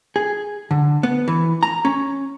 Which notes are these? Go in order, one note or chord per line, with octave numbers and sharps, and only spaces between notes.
G#4
D3
B3
E3
A#5
C#4